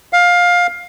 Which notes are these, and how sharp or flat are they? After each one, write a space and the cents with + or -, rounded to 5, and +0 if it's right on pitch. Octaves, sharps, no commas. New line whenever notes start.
F5 +20